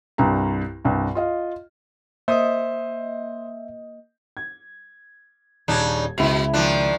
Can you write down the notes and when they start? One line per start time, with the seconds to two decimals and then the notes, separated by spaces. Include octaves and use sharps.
0.18 C2 G2 A#5
0.85 C2 G2
1.15 F4 D#5 F5
2.28 A#3 C5 D#5 E5 D#6
4.37 G#6
5.68 D#1 C#3 D4 D#4 A5 G#6
6.18 C#2 B2 E4 F7
6.54 D#3 F3 D4